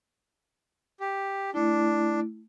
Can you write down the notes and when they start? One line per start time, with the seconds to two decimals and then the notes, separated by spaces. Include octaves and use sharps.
1.00 G4
1.54 A3 D4 E4